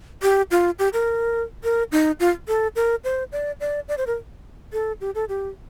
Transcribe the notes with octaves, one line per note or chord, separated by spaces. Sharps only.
G4
F4
G4
A#4
A#4
D#4
F4
A4
A#4
C5
D5
D5
D5
C5
A#4
A4
G4
A4
G4